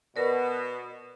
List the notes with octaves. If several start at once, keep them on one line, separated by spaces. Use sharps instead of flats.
B2 A#4 B4 D5